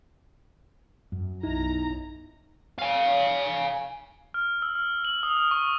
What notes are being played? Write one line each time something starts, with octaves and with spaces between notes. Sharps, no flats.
F#2
B1 D#4 E4 A#5
F5 G#5
F6
E6
F6
F#7
D#6
F6
C#6